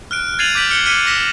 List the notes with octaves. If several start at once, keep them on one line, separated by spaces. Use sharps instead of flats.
F6 F#6 D7
G#6 A6 C7 D#7 F7 F#7
D6 G6 B6 D7 F#7
F6 C#7 D7 F#7 G7
F6 B6 C#7 D#7
D6 A#6 B6 E7